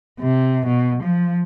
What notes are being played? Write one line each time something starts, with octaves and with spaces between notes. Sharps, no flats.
C3
B2
F3